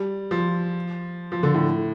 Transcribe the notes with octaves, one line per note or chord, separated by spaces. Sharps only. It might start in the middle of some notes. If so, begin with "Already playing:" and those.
Already playing: G3
F3
F3
D3
A2